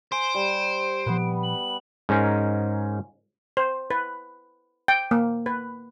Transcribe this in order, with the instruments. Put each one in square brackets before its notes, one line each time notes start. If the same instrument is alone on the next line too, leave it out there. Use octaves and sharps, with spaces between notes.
[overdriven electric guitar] C5 [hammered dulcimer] G#5 [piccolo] D7
[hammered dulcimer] G3
[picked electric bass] A#2 F3 [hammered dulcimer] B3 B4
[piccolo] F#7
[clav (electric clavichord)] G#2 C#4 D#4 G#4 A#4
[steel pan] C5
B4
G5
A#3
B4